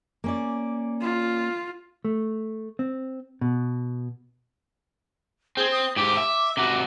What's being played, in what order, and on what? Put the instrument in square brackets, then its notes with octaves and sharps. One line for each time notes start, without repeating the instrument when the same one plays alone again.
[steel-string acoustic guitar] A#3 C#4 D5
[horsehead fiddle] F4
[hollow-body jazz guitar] A3
C4
B2
[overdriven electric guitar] C4 [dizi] G#4
[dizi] D#6
[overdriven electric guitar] G#2 G4 [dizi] D6
[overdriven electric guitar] E5
C3 F#4